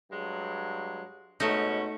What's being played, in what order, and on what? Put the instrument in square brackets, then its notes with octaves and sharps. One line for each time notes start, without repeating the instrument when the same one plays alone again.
[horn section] G2 F#3 G#3
[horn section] G#2 B2 C#4 [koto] A3 D#4